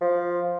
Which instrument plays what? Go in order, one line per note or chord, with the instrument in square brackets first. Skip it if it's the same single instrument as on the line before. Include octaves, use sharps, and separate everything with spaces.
[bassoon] F3